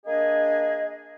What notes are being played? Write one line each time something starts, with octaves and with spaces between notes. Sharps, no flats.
A#3 D4 G#4 D#5